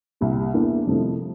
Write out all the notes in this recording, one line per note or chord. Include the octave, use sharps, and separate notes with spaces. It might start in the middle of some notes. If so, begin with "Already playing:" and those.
C2 A#2 G3
E2 E3 A#3 D4
F2 C3 F3 A3 E4